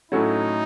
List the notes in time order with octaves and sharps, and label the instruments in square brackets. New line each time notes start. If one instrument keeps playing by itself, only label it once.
[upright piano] A2 F#3 A3 C#4 F#4 [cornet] D#4